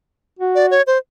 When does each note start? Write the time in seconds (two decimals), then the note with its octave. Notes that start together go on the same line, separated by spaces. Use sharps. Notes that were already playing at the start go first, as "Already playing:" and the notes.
0.39 F#4
0.55 D5
0.71 C#5
0.87 C5